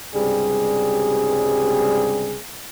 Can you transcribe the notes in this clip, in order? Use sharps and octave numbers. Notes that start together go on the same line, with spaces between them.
C#2 G2 C3 G3 G#4